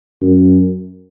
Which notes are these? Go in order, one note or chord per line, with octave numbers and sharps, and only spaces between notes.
F#2